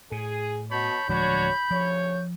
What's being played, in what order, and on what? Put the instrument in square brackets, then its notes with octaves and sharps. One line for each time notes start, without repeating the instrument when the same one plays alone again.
[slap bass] A2 [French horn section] G#4 [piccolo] D#7
[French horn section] B2 [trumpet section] C#5 A5 B5 [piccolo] G6
[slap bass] D1 F3 G#3 [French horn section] D4 F#4 C#5 [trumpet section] B5
[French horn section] D2 C#3 C#5 [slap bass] F3